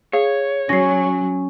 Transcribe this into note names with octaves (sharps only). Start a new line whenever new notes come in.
G#4 C#5 F5
F#3 C#4 A#6 C7